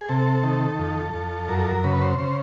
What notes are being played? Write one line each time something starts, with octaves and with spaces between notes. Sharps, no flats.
G#4
C3 A4
D#3
F2
F2
F#2 A#4
A4
A#4
C#3 B4
C5
C#3 C5